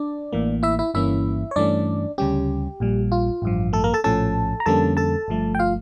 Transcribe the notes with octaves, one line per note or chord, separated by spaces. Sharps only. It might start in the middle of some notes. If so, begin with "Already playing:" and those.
Already playing: D4 D5
A1 A2 E3 A#3
E4 E5
E4 E5
G1 G2 E3 A#3 C#4 E4 E5
C#5
G2 E3 A3 C#4 D4 D5
D2 C#3 G3 C#4 G4
A#1 A#2 G3
F4
A1 G2 F3
A3 A4
A#3 A#4
A4 A5
A#1 A2 F3 C#4 A4 A5
A#5
F2 D3 G3 A#3 C#4 A4 A5
A4 A5
G1 G2 F3 A3
G5
F4 F5